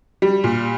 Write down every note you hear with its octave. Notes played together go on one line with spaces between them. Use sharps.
G3
A#2